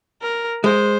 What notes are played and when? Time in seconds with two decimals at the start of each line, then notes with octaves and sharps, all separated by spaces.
0.22 A#4
0.64 G#3 C5